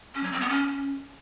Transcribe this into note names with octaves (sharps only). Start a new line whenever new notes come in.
C#4
F#3
C4
B3
C#4